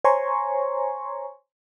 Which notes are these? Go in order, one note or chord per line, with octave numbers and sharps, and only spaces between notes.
C5 C#5 G#5 A#5 C6 C#6